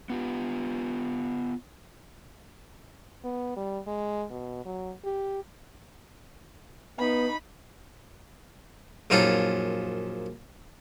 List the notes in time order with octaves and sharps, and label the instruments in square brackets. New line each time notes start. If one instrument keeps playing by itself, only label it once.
[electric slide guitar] B3 F4 G4
[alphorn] B3
G3
G#3
B2
F#3
G4
[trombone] B3 [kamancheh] D#4 B5
[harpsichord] A#1 F#2 D#4 F4 A4